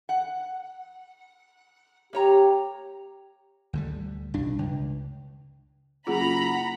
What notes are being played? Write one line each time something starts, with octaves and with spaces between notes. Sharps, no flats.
F#5
A#3 G4 C#5 A#5
D2 D3 G3
B1 G2 D4
C#2
F#1 F4 G#4 F#5 A#5 B5